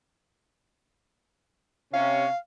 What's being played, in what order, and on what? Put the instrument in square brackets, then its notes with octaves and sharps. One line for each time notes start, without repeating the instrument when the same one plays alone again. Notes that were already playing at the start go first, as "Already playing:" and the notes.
[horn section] C3 C#4 [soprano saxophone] F5